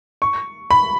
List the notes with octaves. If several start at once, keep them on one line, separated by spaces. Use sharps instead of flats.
C#6
B5